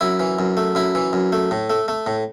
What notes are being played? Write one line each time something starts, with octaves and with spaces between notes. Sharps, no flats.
F#2 E4
E3
F#2
A3
F#2 E4
E3
F#2
A3
A2
A3
A3
A2